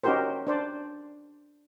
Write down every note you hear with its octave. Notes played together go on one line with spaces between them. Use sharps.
C#4 D#4 F#4 G4 A#4 C5
D4 C5 D5